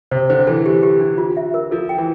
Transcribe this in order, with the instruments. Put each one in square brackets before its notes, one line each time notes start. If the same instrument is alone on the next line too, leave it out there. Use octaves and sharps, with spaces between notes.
[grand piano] C3 [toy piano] C5
[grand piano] D3 [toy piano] C5
[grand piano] E3 [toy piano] A4
[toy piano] G4
G4
D4
F4
E5
A#4
[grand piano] F3 [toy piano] A4
[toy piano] G5
[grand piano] E3